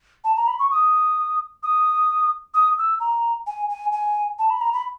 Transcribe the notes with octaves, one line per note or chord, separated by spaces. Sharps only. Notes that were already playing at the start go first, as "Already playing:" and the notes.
A5
A#5
B5
C#6
D#6
D#6
D#6
E6
A#5
G#5
G#5
G#5
A5
B5
A#5
B5